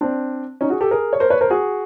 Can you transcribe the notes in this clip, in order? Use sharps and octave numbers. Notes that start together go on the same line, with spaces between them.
C4 D4
C#4 D#4
F#4 G#4
G4 A4
G#4 A#4
C#5
A#4 C5
B4 C#5
A#4 C5
F#4 G#4